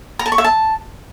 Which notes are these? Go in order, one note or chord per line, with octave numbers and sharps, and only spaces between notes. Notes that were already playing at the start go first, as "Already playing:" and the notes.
A#5
A5
C#6
E5
A5